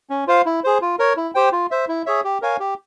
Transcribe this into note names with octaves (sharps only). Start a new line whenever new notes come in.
C#4
F4 C5 F5
E4
G#4 C5
F4
A#4 C#5
E4
G4 C5 G5
F4
C5 E5
E4
G#4 C#5 E5
G4
A#4 C#5 F5 G#5
G4